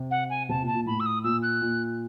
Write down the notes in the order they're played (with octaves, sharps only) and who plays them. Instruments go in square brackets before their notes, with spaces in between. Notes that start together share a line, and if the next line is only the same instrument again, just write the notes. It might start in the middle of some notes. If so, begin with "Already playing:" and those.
Already playing: [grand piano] C3
[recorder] F#5
G#5
[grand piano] C3 [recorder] A5
[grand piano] A#2
[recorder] A5
[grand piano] A#2
[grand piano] A2 [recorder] B5
[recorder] E6
D#6
[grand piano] A#2 [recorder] E6
[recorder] F#6
[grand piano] A#2